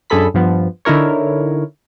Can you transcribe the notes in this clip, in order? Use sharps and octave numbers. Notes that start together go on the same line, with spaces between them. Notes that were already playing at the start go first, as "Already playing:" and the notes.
F#2 D3 G#4 A4 B5 B6
G2 F3 B3
D3 D#4 E4 A#4 C#5